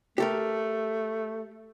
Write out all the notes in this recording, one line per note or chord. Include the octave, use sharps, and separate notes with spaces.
A3 G4 A4 A#4